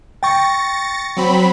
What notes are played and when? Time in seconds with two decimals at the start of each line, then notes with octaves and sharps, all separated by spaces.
0.23 G5 C#6 A6 A#6 C#7
1.17 F#3 C4 B5